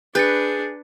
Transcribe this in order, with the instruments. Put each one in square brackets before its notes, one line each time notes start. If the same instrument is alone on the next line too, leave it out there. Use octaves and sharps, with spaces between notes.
[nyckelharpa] D4 [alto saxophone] G#4 [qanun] B4 [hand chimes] G6 A6 C#7